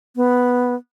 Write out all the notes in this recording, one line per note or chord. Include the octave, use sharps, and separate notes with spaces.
B3